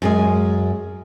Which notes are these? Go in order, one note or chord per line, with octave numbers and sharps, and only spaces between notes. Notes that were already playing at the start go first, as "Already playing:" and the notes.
F#2 G#3 G#4